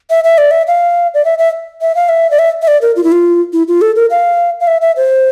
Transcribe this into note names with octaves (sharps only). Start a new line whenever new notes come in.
E5
E5
D5
E5
F5
D5
E5
E5
E5
F5
E5
D5
E5
E5
D5
A#4
F4
E4
F4
E4
F4
A4
A#4
F5
F5
E5
E5
C5